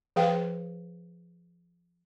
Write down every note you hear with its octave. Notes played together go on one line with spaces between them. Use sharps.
F3 G#4 B4 F5 G5